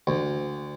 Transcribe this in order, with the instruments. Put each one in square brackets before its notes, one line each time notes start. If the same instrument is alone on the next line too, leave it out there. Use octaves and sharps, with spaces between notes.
[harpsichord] D2